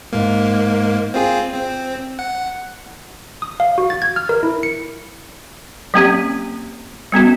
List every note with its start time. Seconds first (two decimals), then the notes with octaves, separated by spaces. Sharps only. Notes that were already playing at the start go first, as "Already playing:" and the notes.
0.12 G#2 A#3
1.14 C4 F4 G#4
1.54 C4
2.19 F#5
3.42 D#6
3.60 F5
3.78 F#4
3.90 A6
4.02 G#6
4.16 F6
4.29 A#4
4.43 E4
4.63 C#7
5.94 F#3 A#3 C4 C#4 G4
7.12 G3 B3 C#4 F#4